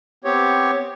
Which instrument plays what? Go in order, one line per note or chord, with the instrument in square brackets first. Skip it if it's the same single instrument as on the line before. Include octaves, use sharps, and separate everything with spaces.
[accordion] B3 C4 G4 C#5